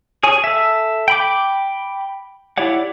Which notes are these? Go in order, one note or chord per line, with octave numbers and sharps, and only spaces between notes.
G#4 C#5 G#5
A4 E5
G5 B5 D6
E4 G4 C#5 D5 F#5